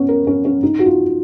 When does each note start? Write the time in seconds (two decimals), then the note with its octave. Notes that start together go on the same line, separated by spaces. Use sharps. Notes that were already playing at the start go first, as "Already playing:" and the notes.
Already playing: B3 C#4
0.09 A#4
0.27 C#4
0.45 C#4
0.63 D#4
0.79 F#4
0.86 F4